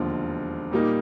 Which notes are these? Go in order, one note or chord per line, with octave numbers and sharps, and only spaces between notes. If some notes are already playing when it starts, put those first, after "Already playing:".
Already playing: E1 D#2 D3 F3
A#2 G3 A#3 D#4